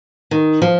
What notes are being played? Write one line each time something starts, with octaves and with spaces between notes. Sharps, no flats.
D#3
F3